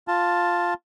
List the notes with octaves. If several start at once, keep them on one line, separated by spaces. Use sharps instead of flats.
F4 A5